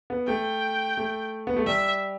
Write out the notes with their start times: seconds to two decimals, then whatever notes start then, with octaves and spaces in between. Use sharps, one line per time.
0.10 B3
0.27 A3 G5
0.97 A3
1.47 B3
1.57 A3
1.66 G3 E5